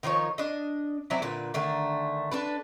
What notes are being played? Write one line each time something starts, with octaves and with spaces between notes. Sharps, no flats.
D#3 F3 D#4 C#5
D4 D#5
F#3 C4 D4 E4
A#2 D3 B4
D3 D#3 A3
D4 A4 B4